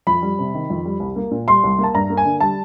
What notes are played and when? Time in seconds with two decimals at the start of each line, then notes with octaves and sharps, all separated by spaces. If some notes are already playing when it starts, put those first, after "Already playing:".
0.07 F2 B5
0.22 G3
0.39 C3
0.54 D#3
0.70 F2
0.85 G3
1.00 C2
1.16 A#3
1.31 A#2
1.48 G3 C6
1.64 C2
1.79 A#3 A5
1.94 G2 A#5
2.10 A#3
2.17 G#5
2.25 D3
2.40 G3 A5